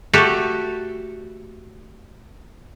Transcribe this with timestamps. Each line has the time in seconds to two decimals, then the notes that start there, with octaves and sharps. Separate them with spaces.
0.13 A3 F#4 G4 A4